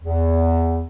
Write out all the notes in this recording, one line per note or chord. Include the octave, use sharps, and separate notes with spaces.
E2